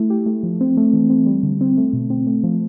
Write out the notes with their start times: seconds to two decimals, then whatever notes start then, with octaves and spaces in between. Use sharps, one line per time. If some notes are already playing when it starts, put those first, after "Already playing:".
Already playing: A3 E4
0.10 G4
0.26 A3
0.43 F3
0.61 C4
0.77 A3
0.93 E3
1.10 C4
1.26 G3
1.43 D3
1.61 C4
1.77 A3
1.93 B2
2.10 C4
2.27 A3
2.44 F3